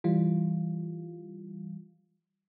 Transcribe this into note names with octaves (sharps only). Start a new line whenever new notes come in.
E3 G3 F4